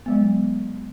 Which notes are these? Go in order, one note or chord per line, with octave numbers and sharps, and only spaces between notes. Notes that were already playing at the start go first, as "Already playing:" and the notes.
F#3 G#3 B3